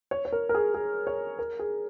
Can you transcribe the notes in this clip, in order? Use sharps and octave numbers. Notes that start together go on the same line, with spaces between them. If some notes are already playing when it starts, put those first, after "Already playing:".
C#5
C#5
A#4
A#4
G#4
G#4
C#5
A#4
G#4